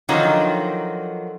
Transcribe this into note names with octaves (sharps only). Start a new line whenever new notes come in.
D3 D#3 F3 F#3 D#4